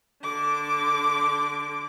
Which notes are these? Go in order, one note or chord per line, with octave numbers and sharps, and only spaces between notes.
D3 D6